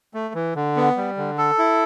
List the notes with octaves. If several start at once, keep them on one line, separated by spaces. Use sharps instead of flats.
A3
E3
D3
B3
G3
D3
A4
E4